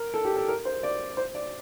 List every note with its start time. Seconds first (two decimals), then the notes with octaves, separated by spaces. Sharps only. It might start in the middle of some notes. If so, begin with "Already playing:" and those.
Already playing: A#4
0.14 A4
0.25 G4
0.36 A4
0.48 A#4
0.65 C5
0.83 D5
1.17 C5
1.35 D5